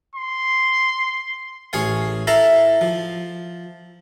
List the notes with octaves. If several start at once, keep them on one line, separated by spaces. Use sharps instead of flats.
C6
A1 G#4 C#5 F5
E4 A4 E5 F5 A#5
F3